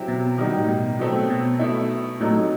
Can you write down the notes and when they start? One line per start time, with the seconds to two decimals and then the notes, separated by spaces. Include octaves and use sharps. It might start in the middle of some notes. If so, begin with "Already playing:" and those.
Already playing: C3 F#3 C4 E4
0.08 B2
0.38 D#3 G3 D#4 F#4
0.57 A2
0.68 B2
0.99 B2 F#3 A3 C4
1.30 B2
1.59 B2 A3 E4
2.20 A2 C3 F#3 A3 D#4